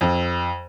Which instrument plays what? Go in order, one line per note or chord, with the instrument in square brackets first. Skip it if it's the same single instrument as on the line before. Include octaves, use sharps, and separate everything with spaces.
[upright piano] F2